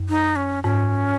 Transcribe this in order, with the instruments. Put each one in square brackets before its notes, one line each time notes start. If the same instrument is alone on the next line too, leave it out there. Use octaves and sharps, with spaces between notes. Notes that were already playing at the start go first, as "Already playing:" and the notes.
Already playing: [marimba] F#2
[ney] D#4
C#4
[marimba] G#2 [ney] C#4